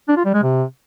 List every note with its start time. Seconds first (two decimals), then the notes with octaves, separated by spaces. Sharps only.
0.08 D4
0.17 F4
0.25 G3
0.34 G#3
0.43 C3